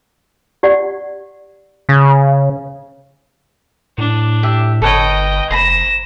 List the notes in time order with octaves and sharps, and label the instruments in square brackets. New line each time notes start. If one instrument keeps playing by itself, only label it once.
[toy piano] G4 D5 F#5
[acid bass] C#3
[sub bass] A2 [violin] D4
[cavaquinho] G4 E5
[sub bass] G1 [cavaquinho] A4 B4 C#5 [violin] D#5 G5
[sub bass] F1 [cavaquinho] C5 A#5 B5 [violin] A#6 E7